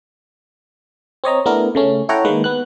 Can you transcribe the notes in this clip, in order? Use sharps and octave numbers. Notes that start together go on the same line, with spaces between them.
C4 C#5 D#5 A#5
A3 B3 D4 E4 A#4
C#3 A3 C#4
E4 A4 C#5 F#5 G5 A#5
D#3 G#3 A#3 B4
B3 F#6